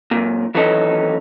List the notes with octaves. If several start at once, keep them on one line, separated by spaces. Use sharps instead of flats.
F#2 A#2
D#2 E3 F#3 C#4 A4 D#5